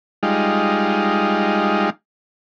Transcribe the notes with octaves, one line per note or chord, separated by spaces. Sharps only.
G3 G#3 D#4 F4